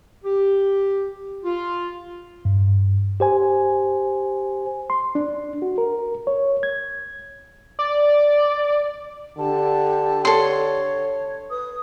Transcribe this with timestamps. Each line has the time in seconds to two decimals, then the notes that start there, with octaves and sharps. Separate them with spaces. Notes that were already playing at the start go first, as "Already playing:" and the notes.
0.24 G4
1.44 F4
2.45 G2
3.20 G4 C5 G#5
4.90 C6
5.15 D4
5.62 F#4
5.78 A#4
6.27 C#5
6.63 G#6
7.79 D5
9.38 D3 G4 A5
10.25 A4 C#5 C6
11.50 B4 D#6